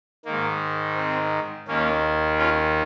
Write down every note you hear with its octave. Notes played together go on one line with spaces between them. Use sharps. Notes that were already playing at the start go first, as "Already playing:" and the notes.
D#3 A#3
G#2
C4
D#2 D#3 A#3 C#4
C#4 F4